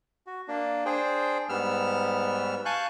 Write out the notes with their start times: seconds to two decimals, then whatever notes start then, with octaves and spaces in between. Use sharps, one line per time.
0.27 F#4
0.48 A#3 D4
0.86 D4 G#4 C5 G5
1.49 G#2 G3 B3 E6 F6
2.65 F5 G#5 A5 C#6 F#6 G6